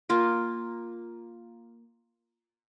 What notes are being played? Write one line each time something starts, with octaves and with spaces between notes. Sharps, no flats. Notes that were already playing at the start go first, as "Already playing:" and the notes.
A#3 F4 G5